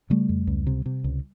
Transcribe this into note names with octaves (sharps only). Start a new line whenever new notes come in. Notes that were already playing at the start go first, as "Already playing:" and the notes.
C#3 G3 A3
F2
C#2
C3
C3
C#2